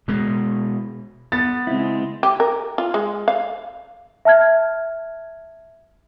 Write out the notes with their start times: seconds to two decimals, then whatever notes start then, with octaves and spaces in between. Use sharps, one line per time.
0.08 B2 G#3
1.32 B3 A6
1.67 C#3 G#3 C4 E4
2.23 G4
2.40 A#4
2.78 F4
2.94 G#3
3.28 F5
4.25 E5 A5 F6 G#6